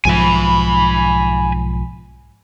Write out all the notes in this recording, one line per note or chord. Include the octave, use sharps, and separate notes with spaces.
B1 G#2 F3 G#5 B5